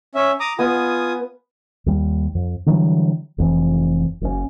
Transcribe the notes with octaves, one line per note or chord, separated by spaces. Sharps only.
C#4 E5
A#5 D6 D#6
B3 F4 G#5 D#6
D#2 G3
F2
D3 E3 F#3 G3
F1 F2 E3
F#1 F#2 A2 C#4